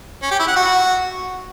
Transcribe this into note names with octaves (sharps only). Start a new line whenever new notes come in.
C#4
G4
E4
F#5
F#4